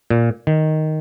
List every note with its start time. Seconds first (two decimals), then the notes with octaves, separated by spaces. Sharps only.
0.10 A#2
0.47 D#3